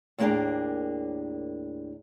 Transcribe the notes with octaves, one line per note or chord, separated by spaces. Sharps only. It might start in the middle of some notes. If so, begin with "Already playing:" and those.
D#2 A2 A#3 D4 G#4 A#5